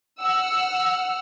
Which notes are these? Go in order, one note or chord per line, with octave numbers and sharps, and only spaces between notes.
F#5 E6 F6